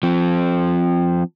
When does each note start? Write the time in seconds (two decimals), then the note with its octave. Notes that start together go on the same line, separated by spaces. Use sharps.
0.03 F3 C4